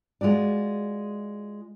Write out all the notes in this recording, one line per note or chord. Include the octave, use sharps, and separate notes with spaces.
G#3 F4 F#4 D5